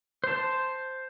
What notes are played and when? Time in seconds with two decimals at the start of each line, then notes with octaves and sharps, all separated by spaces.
0.24 C5 A5